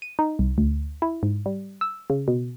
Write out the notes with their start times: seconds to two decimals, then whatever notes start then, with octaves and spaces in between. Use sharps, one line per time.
0.02 D#7
0.19 D#4
0.39 C2
0.58 D2
1.02 E4
1.23 G#2
1.46 G3
1.81 E6
2.10 C#3
2.28 B2